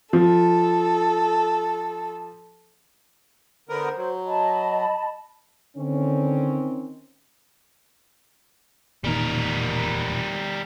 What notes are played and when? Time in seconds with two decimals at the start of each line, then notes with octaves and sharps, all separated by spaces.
0.13 F3 A4
3.69 D3 B3 A#4 C5
3.96 F#3
4.25 D#5 A5 B5
5.77 D3 D#3 C4 C#4
9.04 E1 A#2 D#3 G3 A#4